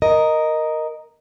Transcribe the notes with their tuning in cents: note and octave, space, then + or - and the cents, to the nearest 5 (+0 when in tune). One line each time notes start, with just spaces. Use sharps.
A#4 +0 D#5 +0